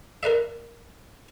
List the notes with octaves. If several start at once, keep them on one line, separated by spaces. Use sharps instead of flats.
A#4 B4 D5 E5